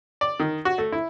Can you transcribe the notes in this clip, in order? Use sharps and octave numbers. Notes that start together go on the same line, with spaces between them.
D5
D#3
F#4
A3
E4